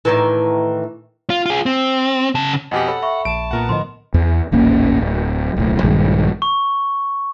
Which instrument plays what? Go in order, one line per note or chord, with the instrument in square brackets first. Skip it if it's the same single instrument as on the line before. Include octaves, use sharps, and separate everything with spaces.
[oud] A2 D#3 E3
[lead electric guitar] F4
F4 G#4
C4
C#3 A5
[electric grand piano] F2 B2 G4 [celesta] D#5 G#5 [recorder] F#5
[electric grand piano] A4 [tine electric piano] C#5 [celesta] B5
[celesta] E5 B5 C#6
[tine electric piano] A#1 [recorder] A5 [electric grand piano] D7
[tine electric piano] B1 A#2 A#5 [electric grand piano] B3 A#4 F#5
[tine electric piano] A2 D3 F3 [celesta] D#5 C6
[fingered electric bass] E2
D#1 A1 A#3 C#4
D1
D1 B1 A2
A#1 G2 D#3 G#3
[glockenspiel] C#6